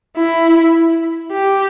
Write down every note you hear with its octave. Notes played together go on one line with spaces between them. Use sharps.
E4
G4